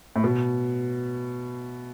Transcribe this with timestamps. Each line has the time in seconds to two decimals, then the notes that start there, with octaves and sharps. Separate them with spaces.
0.16 A2
0.24 B2